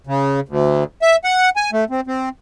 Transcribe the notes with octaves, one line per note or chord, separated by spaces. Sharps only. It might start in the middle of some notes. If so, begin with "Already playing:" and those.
C#3
D2
E5
F#5
G#5
A3
C4
C4